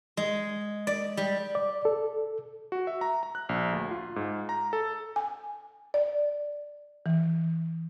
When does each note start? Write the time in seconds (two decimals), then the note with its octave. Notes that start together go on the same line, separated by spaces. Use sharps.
0.17 G#3
0.87 D5
1.17 G3
1.55 D5
1.85 A4
2.72 F#4
2.87 E5
3.01 A#5
3.23 A#5
3.35 F#6
3.49 A#1
3.73 D2
3.91 F4
4.16 G#2
4.49 A#5
4.73 A4
5.16 G#5
5.94 D5
7.06 E3